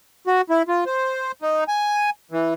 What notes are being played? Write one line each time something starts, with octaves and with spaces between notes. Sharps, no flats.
F#4
E4
F4
C5
D#4
G#5
E3